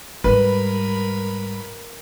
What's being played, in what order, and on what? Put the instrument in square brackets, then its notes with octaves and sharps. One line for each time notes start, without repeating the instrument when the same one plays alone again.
[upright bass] G#2 G3 [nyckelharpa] A#4 B5 [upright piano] B4